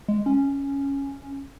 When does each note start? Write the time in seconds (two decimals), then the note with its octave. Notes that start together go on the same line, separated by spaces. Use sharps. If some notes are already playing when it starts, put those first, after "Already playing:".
0.08 G#3
0.26 C#4